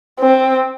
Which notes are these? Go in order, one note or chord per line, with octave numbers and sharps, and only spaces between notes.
C4